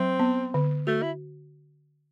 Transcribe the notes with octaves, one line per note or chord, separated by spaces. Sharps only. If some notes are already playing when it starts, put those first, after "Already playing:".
Already playing: F#3 C4
B3
D3
A3 F#4
E4